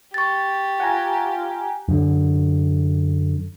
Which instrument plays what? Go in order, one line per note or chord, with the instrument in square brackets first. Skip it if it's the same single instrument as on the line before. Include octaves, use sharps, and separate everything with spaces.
[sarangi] G4 [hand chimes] C#6 A6
[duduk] F4 [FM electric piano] F#5 G#5 A#5
[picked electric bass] F#2 D3